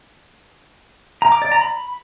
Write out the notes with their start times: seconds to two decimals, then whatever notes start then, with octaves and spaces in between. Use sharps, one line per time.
1.22 A#5
1.32 D6
1.42 D5
1.52 A#5
1.61 B5